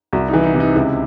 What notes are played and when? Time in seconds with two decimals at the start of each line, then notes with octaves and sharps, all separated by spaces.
0.13 C2 F#4
0.28 D#4
0.33 E3
0.44 D#4
0.54 C3
0.60 D#4
0.76 C#2 E4